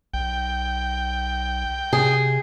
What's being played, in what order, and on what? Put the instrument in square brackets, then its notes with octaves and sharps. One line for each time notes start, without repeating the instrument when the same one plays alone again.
[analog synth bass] B1 [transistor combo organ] G5
[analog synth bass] C3 [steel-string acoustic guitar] G#4